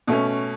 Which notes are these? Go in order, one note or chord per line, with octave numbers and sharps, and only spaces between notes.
B2 A3 C#4